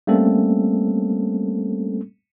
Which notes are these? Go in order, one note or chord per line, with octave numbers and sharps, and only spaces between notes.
G3 A3 A#3 C4 C#4 A4